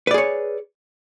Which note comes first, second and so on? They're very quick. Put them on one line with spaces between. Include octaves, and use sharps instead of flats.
B4 D5 G#4 C#5